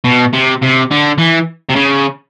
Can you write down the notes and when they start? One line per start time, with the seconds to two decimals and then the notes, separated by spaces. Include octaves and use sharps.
0.04 B2
0.33 C3
0.62 C3
0.91 D3
1.18 E3
1.70 C3
1.76 C#3